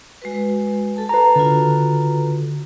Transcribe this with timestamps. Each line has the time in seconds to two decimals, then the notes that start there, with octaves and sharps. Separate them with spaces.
0.22 G#3 F#4 B4
0.96 A4 A5
1.09 B4 A#5
1.36 D3 F4 F#4 A4